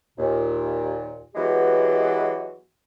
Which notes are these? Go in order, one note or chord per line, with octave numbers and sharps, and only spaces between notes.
D#2 A#2
E3 F#3 G#3 B3 F#4 G4